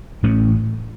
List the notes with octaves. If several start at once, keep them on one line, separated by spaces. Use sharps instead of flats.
A1 A2 A3 C#4